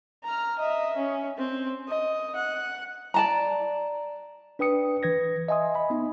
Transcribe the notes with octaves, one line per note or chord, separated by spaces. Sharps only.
A#5 F6
D#5 E5
C#4
C4
D#5
F#5
D5 A5 A#5
D4 B4 G5 D#6 C#7
E3 B4 G#6 A#6
D#5 E5 G#5 C6 D#6
D#5 B5
B3 D#4